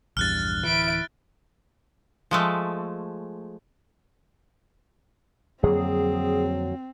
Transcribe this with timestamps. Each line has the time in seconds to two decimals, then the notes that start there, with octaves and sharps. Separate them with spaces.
0.17 A#1 E2 G2 F6 F#6 A6
0.65 D1 E3 E4 D7
2.31 F3 G#3 A3
5.63 F2 D3 F#3 A#3 C4 G#4